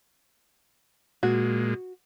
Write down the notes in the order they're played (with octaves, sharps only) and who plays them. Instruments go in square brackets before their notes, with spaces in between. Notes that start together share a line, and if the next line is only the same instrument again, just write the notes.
[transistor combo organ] A#2 G#3 [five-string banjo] F#4